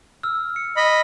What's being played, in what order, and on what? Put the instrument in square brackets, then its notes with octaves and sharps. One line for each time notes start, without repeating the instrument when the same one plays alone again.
[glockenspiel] E6 F6
C#7
[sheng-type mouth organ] D#5 B5